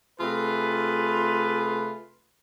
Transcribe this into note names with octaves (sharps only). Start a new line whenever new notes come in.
C3 A3 F4 G#4 B4